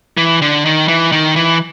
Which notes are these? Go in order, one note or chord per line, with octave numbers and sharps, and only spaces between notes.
E3
D3
D#3
E3
D#3
E3